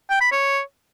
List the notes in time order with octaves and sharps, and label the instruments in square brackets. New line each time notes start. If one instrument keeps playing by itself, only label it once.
[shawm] G5
B5
C#5